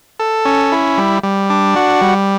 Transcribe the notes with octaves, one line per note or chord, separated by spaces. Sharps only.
A4
C#4
E4
G3
G3
D4
F#4
G3